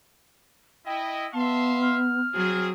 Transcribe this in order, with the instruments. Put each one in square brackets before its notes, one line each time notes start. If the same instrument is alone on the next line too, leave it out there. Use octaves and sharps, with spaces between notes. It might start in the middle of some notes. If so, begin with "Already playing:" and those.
[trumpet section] E4 D#5 [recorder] G5
[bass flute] B3 [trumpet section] E5 F5 C6 [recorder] A5
[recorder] F6
[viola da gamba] F#3 [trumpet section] C4 G#4